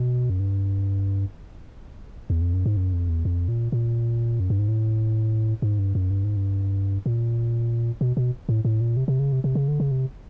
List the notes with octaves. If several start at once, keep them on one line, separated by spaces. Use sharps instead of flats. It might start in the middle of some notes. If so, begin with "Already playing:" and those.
Already playing: B2
F#2
G2
E2
F2
F#2
G#2
F#2
F2
E2
F2
A#2
A#2
F#2
G2
G#2
A2
G#2
G2
F#2
G2
G#2
G2
A#2
B2
B2
A2
A2
A#2
C3
C3
C#3
C3
C3
C#3
D3
C#3
C3